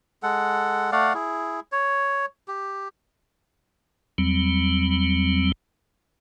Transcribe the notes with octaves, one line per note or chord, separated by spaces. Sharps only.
G#3 A4 F#5
A3 D5 F5 F#5
E4 G#4
C#5
G4
E2 F#3 G3 C4